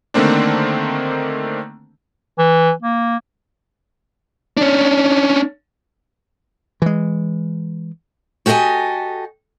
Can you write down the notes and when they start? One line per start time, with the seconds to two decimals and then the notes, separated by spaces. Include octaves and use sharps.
0.14 D3 D#3 A3 A#3 C4 D4
2.38 E3
2.82 A#3
4.57 C#4 D4
6.82 E3 G#3
8.46 F#4 G4 A4 B4 D#5 G#5